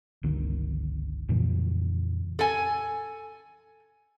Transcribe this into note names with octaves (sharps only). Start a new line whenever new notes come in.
G1 C#2 D3 D#3
F2 A#2 C#3 E3
A4 G#5